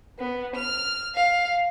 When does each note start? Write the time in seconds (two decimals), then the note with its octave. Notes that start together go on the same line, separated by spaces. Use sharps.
0.19 B3
0.56 F6
1.15 F5